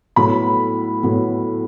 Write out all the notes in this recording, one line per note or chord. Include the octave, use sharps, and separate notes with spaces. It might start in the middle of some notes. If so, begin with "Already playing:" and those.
A2 F#3 B3 B5
A2 F#3 B3